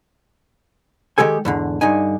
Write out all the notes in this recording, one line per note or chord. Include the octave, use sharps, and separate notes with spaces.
D#3 G#3 G4 A4 G#5
E2 G#2 D3
G2 D3 D#4 G#5